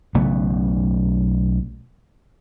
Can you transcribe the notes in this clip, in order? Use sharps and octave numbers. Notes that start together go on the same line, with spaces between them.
B1 C#3 A3 B3